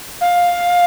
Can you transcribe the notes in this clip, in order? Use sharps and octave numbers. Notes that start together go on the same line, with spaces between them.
F5